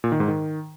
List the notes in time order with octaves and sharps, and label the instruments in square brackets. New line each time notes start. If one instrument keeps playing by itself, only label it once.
[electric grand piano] A#2
D#3
G#2
D#3